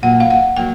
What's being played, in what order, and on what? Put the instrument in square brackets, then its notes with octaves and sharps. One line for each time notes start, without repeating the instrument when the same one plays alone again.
[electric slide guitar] A#2 F#3 A#3 [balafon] F#5
[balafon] F5
F#5
[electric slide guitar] F#3 A#3 [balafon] G5